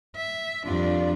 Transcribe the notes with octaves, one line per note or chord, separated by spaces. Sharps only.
E5
F2 G3 D4 F4 D5